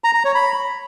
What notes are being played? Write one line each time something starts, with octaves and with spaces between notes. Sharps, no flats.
A#5
A#5
C#5
B5